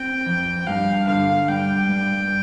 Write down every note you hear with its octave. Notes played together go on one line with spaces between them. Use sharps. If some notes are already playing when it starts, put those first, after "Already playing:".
Already playing: C4 G5
F2
G2 F5
D3 F5
G2 G5
G2